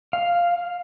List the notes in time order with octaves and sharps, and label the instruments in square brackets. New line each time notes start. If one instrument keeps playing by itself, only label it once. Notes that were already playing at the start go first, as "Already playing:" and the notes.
[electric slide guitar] F5